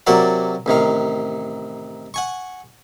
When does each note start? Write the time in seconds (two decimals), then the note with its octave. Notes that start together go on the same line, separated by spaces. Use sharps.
0.07 C3 F#3 A#3 F#4 D5 A5
0.66 A1 C3 D#3 F5
2.14 F#5 G#5 C#6